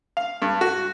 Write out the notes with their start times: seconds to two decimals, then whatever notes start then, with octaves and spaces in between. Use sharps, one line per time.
0.17 F5
0.42 G2
0.61 F#4